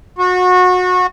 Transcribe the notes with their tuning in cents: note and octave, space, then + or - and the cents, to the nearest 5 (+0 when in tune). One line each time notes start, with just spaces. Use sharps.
F#4 -25